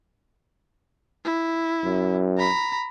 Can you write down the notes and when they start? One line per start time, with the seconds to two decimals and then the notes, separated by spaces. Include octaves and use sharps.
1.25 E4
1.85 F#2
2.38 A#5 B5